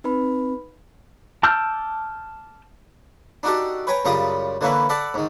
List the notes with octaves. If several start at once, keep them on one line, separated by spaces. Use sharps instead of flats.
C4 D#4 B4 B5
A5 D6 E6 F6 G6
D4 D#4 F#4 G4 A4
B4 C#5 G5 G#5 A#5
F#2 C#3 G3 F4 A#5 D#6
D3 E3 A#3 C#4 E4 B4
A4 D5 F#5 A5 B5
G#2 D#3